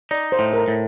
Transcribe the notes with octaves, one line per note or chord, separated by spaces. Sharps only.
D#4 D5
C5
A2
A#4
A2